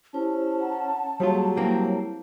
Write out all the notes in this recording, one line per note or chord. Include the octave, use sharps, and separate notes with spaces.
C#4 E4 G4 C5 A5
F#5 A#5
F#3 G3 A#3 F4 G#4
G3 A#3 C4 E4